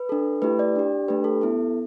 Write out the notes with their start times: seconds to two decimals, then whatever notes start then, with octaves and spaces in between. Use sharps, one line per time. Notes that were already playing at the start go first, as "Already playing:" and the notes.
Already playing: B4
0.09 D4 A4
0.42 A3 E4 G4 B4
0.59 D5
0.76 D4 G4
1.08 A3 D4 G4 B4
1.24 A4
1.41 B3 E4 A4